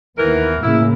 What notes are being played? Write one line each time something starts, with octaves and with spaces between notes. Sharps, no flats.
D#2 E3 B3 A#4
A2 C#3 A#3 E4